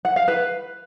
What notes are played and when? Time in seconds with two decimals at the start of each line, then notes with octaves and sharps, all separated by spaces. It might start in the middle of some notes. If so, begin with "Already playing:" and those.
0.05 F#5
0.16 F5
0.28 B4